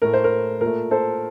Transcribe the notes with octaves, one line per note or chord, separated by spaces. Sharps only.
A2 A3 A#4
C5
A#4
A#2 A3 A#4
A4 C5